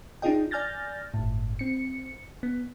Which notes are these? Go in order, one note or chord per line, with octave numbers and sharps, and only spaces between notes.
D4 D#4 F4 G#4 D#5 G5
D5 G#5 F6 G6 A6 A#6
G1 A2
C4 C#7
B3